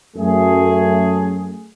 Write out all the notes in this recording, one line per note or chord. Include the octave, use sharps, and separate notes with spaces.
F#2 A3 G#4